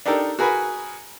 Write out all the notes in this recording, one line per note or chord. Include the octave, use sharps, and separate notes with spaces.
D4 D#4 G4 A4 A#4
F#4 G#4 A#4 B4